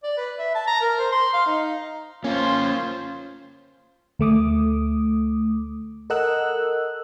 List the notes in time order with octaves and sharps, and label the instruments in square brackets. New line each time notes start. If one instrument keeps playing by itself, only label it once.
[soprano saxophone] D5
B4
E5
A5
A#5
A#4
C5
C6
F5
D#4
[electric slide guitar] A#3 C#5 [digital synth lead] C#4 [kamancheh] F4 C5
[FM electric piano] D2 A3 D6 D#6
A4 A#4 D#5 F#5 E6 F#6